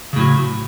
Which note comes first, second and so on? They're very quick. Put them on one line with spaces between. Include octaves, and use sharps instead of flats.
C#3 A2 F#3